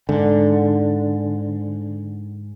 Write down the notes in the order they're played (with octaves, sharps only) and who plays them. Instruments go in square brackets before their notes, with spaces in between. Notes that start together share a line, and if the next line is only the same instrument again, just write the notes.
[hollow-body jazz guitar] G#2 [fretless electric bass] D3